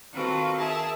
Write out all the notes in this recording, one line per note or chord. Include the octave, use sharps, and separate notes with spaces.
D#3 C4 F4 F#4 A4 B4
G#4 A#4 E5 A5